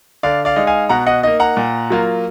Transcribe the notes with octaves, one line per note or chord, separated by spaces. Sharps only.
D3 D5 F5
D5 F5
G#3 D#4
F5 G#5
B2 F#5 A#5
D#5 F#5
A#3 D#4 D#5
F#5 A#5
A#2
F#3 A#3 F4